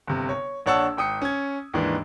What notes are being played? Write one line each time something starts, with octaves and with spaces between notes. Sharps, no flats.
G1 C3
C#5
A#1 D4 C#5 F#5 A5 E6
G#1 G5 D#6 C#7
C#4 G#6
D#2 G#2 D#3 E3 D4